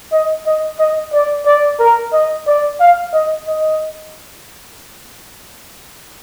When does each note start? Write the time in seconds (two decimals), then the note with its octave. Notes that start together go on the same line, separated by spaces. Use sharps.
0.12 D#5
0.46 D#5
0.79 D#5
1.13 D5
1.45 D5
1.79 A#4
2.13 D#5
2.47 D5
2.80 F5
3.13 D#5
3.47 D#5